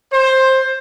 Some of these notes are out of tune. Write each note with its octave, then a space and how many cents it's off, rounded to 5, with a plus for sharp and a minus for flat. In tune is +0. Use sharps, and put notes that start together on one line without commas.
C5 +15